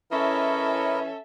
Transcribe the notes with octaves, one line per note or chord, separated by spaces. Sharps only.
E3 C#4 E4 A4 A#4 D#5 E5